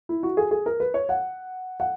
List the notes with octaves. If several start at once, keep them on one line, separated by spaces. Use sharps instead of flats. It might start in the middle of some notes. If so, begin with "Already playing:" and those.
E4
F#4
G#4
G#4
A#4
B4
C#5
F#5
F#5